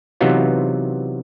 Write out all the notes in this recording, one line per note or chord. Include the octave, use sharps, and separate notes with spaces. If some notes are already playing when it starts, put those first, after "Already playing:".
C3 E3 F#3 B3 D#4 F4